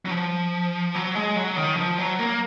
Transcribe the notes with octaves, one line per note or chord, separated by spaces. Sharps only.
F#3
F3
F#3
G#3
F#3
D#3
F3
F#3
A#3